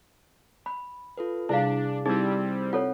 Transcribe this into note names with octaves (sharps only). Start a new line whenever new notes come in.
B5
F4 A4 B4
C3 G3 D4 E4 G#4 F5
G3 C4 D#4 E4 G#4 E6 G#6 A6
C4 F4 A4 C#5 F#5